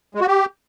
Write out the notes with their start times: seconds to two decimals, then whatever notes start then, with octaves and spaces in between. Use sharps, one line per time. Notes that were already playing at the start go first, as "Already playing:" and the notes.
0.15 G#3
0.21 F#4
0.27 G4